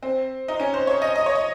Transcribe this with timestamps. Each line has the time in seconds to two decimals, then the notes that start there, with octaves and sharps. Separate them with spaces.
0.03 C4
0.48 D#4
0.60 C#4
0.74 C5
0.87 C#5
1.02 D#5
1.16 D#5
1.26 C#5
1.35 D#5